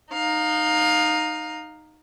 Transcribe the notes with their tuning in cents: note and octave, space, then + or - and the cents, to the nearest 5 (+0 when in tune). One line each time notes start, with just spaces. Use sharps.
D#4 -10 F5 +20